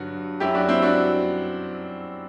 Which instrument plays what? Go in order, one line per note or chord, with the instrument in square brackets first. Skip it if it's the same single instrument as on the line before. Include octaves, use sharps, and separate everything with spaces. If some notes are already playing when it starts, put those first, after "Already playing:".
Already playing: [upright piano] G2 D3 F#3 F#4
F#2 F#3 E4 G4
D4 F#4
C4 E4
D4 F#4